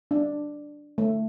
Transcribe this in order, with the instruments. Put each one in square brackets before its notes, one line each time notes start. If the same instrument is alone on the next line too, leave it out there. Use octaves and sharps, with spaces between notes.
[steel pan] D4
A3